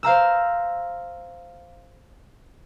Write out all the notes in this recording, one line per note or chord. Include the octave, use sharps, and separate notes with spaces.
C5 F5 A#5 E6